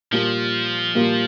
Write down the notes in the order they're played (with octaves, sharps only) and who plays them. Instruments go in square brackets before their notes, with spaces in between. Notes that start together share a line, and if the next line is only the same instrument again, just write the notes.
[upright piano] A#2 G3 A#3 [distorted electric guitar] F3
[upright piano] A#2 G3 A#3